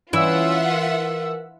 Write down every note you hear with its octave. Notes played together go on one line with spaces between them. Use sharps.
E3 C#4 E4 F4 E5 F#5 E6
A#4